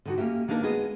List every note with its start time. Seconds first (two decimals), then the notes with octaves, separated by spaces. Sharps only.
0.05 D3 D#3 F#4
0.18 A#3 C4 C#4 G4 E5
0.48 D#3 A#3 D4 D#4 A#4
0.63 G#3 B3 G#4 D#5